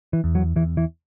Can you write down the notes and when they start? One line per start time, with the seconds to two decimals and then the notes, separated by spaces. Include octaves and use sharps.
0.13 E3
0.24 E2
0.35 F#3
0.56 E2 E3
0.77 E3